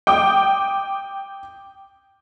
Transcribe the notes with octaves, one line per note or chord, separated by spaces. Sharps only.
G5 D6 D#6